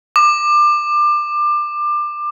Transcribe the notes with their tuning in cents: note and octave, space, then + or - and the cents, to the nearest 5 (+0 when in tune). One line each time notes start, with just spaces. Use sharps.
D6 +25